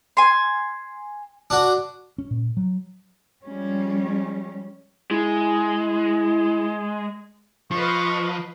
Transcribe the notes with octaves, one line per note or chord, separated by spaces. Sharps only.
G#5 C6
D4 F#4
C#4
A#2
F#3
F3 G3 G#3 C#4
G#3 E4
F3 B4 D#5 F5 C#6